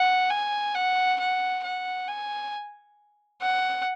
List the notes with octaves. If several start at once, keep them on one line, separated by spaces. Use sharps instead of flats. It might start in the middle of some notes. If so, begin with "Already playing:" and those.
Already playing: F#5
G#5
F#5
F#5
F#5
G#5
F#5